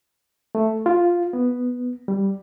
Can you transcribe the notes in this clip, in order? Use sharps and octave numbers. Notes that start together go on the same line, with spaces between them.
A3
F4
B3
G3